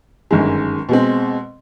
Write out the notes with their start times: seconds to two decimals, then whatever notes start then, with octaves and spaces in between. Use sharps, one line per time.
0.31 G1 F#2 D#3 G#3
0.89 B2 G#3 C4